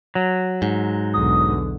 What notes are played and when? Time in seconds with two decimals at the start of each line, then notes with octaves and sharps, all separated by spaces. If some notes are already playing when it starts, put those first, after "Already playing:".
0.15 F#3
0.62 G#2
1.14 B1 E2 D3 D#6